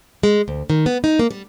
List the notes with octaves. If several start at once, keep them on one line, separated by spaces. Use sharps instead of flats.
G#3
D2
D#3
B3
D#4
A#3
G3